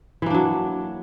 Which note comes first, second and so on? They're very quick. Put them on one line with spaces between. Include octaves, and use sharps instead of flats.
E3 A#3 D4 F#3